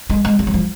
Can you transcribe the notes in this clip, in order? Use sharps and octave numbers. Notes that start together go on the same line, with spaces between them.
G#3
G#3
G3
F#3
F3